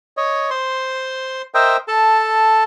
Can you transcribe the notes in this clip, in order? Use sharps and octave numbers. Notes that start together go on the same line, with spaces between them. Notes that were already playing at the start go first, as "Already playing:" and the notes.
C#5 D#5
C5 C6
A#4 C5 D#5 E5 G5
A4 A5